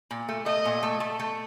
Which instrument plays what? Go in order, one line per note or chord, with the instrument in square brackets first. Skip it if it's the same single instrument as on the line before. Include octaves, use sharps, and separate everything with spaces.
[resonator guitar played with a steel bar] A#2
A3
[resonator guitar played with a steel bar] A3 [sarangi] D#5
[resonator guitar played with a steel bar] A#2
A3
A3
A3